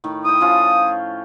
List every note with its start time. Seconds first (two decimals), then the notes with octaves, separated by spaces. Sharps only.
0.04 A2 D#3
0.25 E4 G5 D#6
0.41 F3 C#4 F4